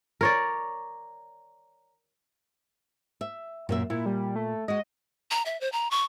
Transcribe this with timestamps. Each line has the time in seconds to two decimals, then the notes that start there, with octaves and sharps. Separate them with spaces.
0.21 A#4 C#5 D5
3.21 E5
3.69 F#2 A#2 A#3 E5
3.90 A#2 E4
4.06 G3
4.36 A3
4.68 G#3 F#4 D#5
5.31 A#5
5.46 E5
5.61 C5
5.72 A#5
5.91 C#6